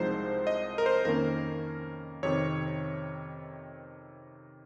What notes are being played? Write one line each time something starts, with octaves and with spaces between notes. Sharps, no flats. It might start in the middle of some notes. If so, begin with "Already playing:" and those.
Already playing: C2 C3 F3 G#3 D#4 C5
D#5
A#4
C5
F2 D#3 A#3 C#4 A#4
F2 C3 D#3 C#5